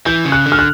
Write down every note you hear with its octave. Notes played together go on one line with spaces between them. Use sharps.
E3 G6
C#3
F#6
D3
F6
F#6